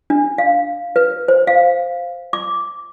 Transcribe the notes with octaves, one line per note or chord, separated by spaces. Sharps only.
D4
F5
B4
C5
F5
D6